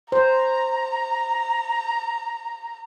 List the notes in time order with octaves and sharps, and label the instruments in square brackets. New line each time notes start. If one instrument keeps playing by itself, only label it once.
[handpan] C5 [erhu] A#5